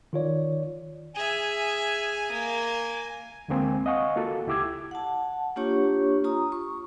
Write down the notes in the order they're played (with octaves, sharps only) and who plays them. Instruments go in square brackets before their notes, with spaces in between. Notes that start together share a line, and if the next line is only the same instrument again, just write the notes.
[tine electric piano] D#3 F4 C#5 D5
[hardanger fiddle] G#4 E5 [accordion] G#5
[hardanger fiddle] A#3
[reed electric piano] D2 D3 G#3 A#3 C4 G#5
D#5 F5 F#5 G#5 C#6
A#3 F4 F#4 A4
C#2 E4 G4 D6 E6 G#6
[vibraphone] F#5 A5
A#3 D4 F4 G4 C#5 C#6
F4 A#5 D#6
C#6